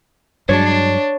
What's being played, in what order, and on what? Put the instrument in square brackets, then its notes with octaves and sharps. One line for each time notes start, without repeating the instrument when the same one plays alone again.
[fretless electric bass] G2 F#3 G#3 [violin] D4 [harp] C#5